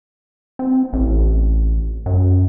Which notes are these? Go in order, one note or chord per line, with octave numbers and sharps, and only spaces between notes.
C4
A1
F#2